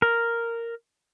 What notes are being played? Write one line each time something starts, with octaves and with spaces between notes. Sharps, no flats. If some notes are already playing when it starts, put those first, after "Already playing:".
A#4